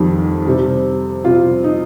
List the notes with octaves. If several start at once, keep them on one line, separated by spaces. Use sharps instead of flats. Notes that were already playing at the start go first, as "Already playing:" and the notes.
Already playing: F2 D#3 G3
C3 G3
C3 G3 F4
D#4